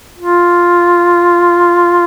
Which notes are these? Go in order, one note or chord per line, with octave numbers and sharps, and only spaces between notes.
F4